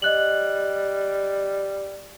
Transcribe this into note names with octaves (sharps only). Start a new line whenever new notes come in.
G3 D#5 F#6 F#7